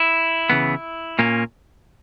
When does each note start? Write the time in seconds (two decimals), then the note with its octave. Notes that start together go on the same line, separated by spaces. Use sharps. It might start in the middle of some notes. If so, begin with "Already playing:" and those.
Already playing: E4
0.50 C#3 E3 B3
1.19 A#2 A#3 C#4